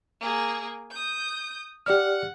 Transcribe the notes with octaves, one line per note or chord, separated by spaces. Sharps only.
A#3 G#4
D#6 G6
G4 D5 F#5 F6